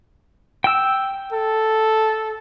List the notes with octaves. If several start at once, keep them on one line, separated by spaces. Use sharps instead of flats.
G5 E6
A4